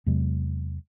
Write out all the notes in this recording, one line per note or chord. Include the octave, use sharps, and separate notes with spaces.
E2 C3 F#3 G#3